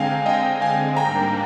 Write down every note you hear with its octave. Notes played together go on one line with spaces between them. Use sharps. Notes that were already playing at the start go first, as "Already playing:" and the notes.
Already playing: D3 G#3 C4 F5 G5 G#5 A#5
D#5 G5
F5 G#5
G#2 G3 A#3 D4 G5 A#5